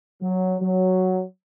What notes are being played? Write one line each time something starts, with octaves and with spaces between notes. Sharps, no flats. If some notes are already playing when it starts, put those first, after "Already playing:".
F#3
F#3